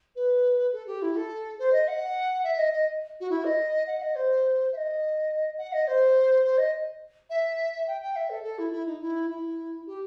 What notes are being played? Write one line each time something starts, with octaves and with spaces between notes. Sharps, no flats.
B4
A4
G4
E4
A4
C5
D#5
F#5
E5
D#5
D#5
F#4
E4
D#5
F#5
D#5
C5
E5
D#5
F#5
D#5
C5
C5
D#5
E5
G5
G5
E5
A4
A4
E4
E4
D#4
E4
E4
G4